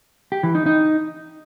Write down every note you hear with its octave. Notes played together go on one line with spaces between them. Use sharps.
G4
E3
D#4
D#4